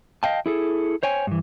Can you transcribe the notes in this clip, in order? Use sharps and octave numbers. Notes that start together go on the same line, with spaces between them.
D#5 F5 G5 A5
E4 G#4 A4
C5 C#5 G5 G#5
G2 E3